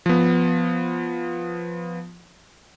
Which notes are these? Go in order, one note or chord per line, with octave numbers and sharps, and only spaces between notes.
F3 B3